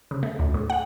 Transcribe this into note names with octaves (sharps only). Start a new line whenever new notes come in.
C#3
A3
D2
A2
F#5